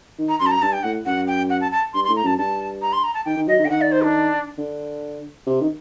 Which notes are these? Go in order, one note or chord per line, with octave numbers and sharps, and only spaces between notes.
D#3
A#5
F#2 C6
A5
A#5
G2 A5
G5
A2 F#5
F#2 F#5
G5
F#5
A5
A5
G2 C6
C6
A2
A#5
F#2 A5
G2 A5
A#5
C6
A#5
A5
D#3 G5
D#3
F#3 D#5
D#3
D3 G5
D#3 F#5
D5
C5
D4
D3
C3
D#3